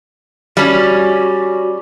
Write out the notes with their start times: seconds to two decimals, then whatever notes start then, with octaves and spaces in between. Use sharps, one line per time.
0.57 G3 C#4 F#4